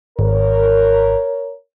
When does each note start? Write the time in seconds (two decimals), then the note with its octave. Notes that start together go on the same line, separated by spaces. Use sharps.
0.19 G#1 A#4 C#5